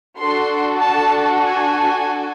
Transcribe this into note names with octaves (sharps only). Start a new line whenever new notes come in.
D4 F#4 A4 C6
A5
G#5